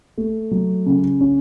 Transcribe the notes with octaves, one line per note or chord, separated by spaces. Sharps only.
A3
F#3
C#3
C#4